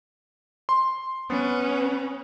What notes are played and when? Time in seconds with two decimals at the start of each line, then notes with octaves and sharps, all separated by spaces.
0.69 C6
1.30 B3 C#4 B4